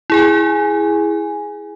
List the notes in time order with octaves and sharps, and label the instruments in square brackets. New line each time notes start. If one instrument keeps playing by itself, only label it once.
[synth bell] E4 G#4 G#5